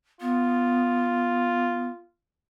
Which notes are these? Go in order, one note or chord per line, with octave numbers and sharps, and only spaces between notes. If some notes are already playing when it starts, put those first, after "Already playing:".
B3 F4